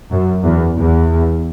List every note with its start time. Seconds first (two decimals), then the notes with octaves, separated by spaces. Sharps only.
0.12 F#2
0.44 E2
0.78 E2